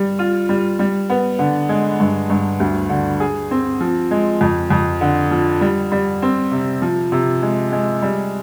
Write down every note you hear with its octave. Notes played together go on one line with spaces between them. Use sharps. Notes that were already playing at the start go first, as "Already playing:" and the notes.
Already playing: G3
F4
G3
G3
B3
D3
G#3
G2
G2
D2
D3
G#4
C4
F3
G#3
F2
F2
D3
F3
G3
G3
C4
C3
F3
C3
G#3
G#3
G3